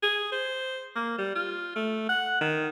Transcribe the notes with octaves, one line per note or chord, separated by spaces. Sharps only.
G#4
C5
A#3
G3
F4
A3
F#5
D#3